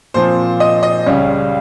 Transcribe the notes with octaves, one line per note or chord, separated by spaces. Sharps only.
A#2 F3 C4 C5
D#5
D#5
C#2 C#3 G3 C#4